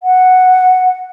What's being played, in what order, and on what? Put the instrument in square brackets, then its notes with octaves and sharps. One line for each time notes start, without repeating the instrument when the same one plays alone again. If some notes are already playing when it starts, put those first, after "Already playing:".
[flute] F#5